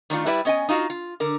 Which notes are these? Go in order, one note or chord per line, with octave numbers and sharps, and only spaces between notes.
D#3 A3 D4 F4
G3 E4 B4 D5 E5
B3 C#4 D#5 G5 G#5
D#4 F4 F#4 F5
F4
D3 A#4